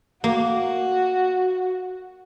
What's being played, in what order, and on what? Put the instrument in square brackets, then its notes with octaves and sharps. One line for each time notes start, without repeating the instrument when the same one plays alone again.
[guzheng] A#3 [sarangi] F#4